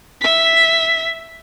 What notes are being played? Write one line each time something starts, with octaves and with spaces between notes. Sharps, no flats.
E5 B6